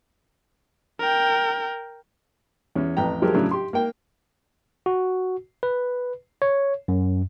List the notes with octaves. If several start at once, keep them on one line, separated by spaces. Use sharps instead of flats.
A#4 G5
E2 C#4
A1 F2 B4 G5 A#5
F3 F#3 G#3 G4 A#4
A2 C#3 F#3 C#4 D4 E4
G4 C6
A#3 A#4 G5
F#4
B4
C#5
F#2